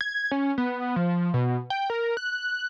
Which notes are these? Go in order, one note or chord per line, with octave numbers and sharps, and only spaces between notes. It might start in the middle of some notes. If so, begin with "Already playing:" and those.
G#6
C#4
B3
F3
B2
G5
A#4
F#6